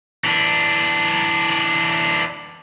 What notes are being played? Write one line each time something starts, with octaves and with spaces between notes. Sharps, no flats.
E3 D4